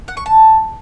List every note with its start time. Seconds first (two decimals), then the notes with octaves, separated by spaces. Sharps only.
0.08 F#5
0.17 C#6
0.26 A5